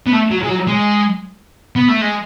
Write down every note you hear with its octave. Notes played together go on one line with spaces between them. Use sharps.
B3
A3
F#3
G#3
F#3
G#3
B3
A3
G#3